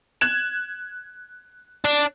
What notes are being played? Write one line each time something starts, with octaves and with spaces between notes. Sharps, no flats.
F#6 G#6 E7
D4